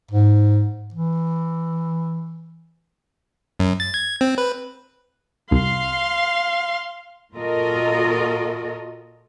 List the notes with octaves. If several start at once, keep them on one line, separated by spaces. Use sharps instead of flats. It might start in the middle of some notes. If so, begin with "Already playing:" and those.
G#2
E3
F#2
A6
G#6
C4
B4
C2 F5 C6
A#2 F4 F#4 A4 A#4 D#5